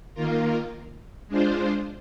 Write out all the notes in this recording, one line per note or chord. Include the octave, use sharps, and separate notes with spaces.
D#3 A#3 F4 A#4
G#3 D4 F4 C5